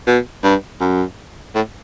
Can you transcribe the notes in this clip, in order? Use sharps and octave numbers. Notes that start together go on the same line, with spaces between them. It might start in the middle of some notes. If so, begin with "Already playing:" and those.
B2
G2
F#2
A2